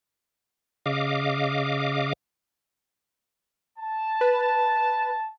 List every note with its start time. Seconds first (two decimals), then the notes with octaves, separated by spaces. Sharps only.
0.86 C#3 D#5 F5 D6
3.79 A5
4.21 B4